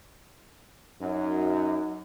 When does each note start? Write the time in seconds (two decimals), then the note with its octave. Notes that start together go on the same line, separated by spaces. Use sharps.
1.02 F#2 D#4